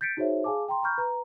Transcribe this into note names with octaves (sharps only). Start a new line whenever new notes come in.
G6 A6 B6 C#7 D7
D#4 F#4 G#4 C5 C#5 E5
G#4 F5 G#5 A5 D6
G5 A#5 C6
A#5 B5 C#6 F6 G6
B4 A#5